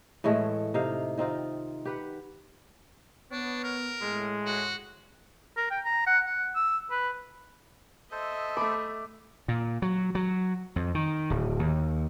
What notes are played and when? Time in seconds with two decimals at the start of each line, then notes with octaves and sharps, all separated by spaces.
0.24 A2 E3 G#3 A3
0.74 C3 D#4 F5
1.18 D#3 C4 D#4 F4
1.85 G4 B4 F#5
3.32 B3 D4 C#5
3.64 A#4
4.01 A2 G#3 G#4
4.46 F#4
5.57 A#4
5.71 G5
5.85 A#5
6.07 F#5
6.26 F#5
6.55 E6
6.91 B4
8.12 A4 C5 D#5 E5
8.57 A3 B5 D6
9.48 A#2
9.82 F#3
10.15 F#3
10.76 F2
10.95 D#3
11.30 D1
11.59 D#2